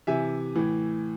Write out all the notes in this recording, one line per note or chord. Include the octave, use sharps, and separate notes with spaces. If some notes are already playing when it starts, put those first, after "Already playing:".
C3 E3 E5 G#5
A2 E3